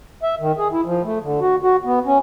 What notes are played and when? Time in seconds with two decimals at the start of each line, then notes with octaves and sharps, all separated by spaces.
0.23 E5
0.40 D#3
0.58 G#4
0.72 E4
0.85 F3
1.03 A3
1.22 D3
1.41 F#4
1.62 F#4
1.85 B3
2.06 C#4